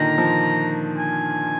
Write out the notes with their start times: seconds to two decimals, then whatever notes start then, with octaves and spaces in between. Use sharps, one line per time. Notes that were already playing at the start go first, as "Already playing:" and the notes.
Already playing: A#2 D3 D#3 A#5
0.18 F3
0.98 G#5